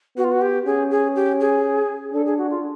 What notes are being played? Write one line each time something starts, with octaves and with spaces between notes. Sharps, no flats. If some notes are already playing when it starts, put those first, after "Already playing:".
B3 F#4
F4
F#4
G4
C#4 G#4
G#4
G4
G#4
D4 A4
G#4
F#4
F4